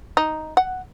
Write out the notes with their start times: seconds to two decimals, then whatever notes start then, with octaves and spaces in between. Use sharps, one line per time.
0.17 D#4
0.57 F#5